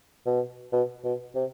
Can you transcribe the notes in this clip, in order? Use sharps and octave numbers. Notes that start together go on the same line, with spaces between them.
B2
B2
B2
C3